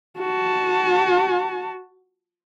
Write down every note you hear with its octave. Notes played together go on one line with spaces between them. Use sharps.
F#4 A5